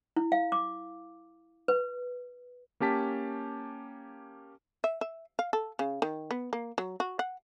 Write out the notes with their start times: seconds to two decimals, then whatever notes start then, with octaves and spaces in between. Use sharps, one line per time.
0.16 E4
0.32 F5
0.52 D6
1.68 B4
2.80 A#3 C#4 G4 A5 B6
4.84 E5
5.01 E5
5.39 F5
5.53 A4
5.79 C#3
6.02 D#3
6.31 B3
6.53 A#3
6.78 F#3
7.00 F#4
7.19 F#5